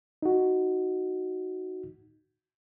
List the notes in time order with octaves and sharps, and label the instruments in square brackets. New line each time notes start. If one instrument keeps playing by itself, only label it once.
[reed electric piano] D#4 F#4